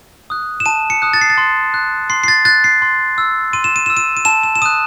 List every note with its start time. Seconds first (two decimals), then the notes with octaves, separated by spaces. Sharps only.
0.30 D#6 F#6
0.60 E7
0.66 A5 D#7
0.90 C#7
1.02 D#6 F#6
1.13 A6
1.21 C7
1.30 A6
1.38 C6
1.74 F#6
2.10 C6 C7
2.24 C7
2.28 A6
2.45 F#6 A6
2.64 C7
2.82 C6
3.18 E6
3.53 C6 D#7
3.64 E7
3.76 D#7
3.86 E6 E7
3.97 D#7
4.17 D#7
4.25 A5 E7
4.43 E7
4.56 E7
4.62 D#6 F#6 D#7